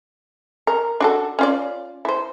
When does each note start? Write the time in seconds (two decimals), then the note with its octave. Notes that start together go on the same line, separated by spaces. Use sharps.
0.67 A#4
1.00 D4 F#4 A4
1.39 C#4 F4 D5
2.05 E4 C5